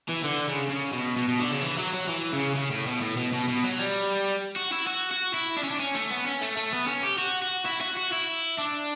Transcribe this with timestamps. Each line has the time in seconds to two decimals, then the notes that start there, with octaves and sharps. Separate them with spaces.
0.08 E3
0.23 D3
0.47 C#3
0.70 C#3
0.93 B2
1.17 B2
1.28 B2
1.40 D3
1.52 C#3
1.62 E3
1.79 F#3
1.94 F#3
2.09 E3
2.33 C#3
2.55 C#3
2.71 A2
2.87 B2
3.01 A2
3.17 B2
3.33 B2
3.48 B2
3.63 F#3
3.79 G3
4.56 F#4
4.72 E4
4.87 F#4
5.11 F#4
5.34 E4
5.57 D4
5.64 C#4
5.71 D4
5.80 C#4
5.95 A3
6.11 B3
6.26 C#4
6.41 A3
6.57 A3
6.73 B3
6.88 C#4
7.03 G4
7.19 F#4
7.42 F#4
7.65 E4
7.81 F#4
7.97 F#4
8.12 E4
8.58 D4